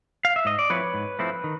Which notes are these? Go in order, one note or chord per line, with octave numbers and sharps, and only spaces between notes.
F5
E5
G#2 D#5
D5
F3 A3 C4 E4 B4 C#5
G#2
F3 A3 C4 E4
D#3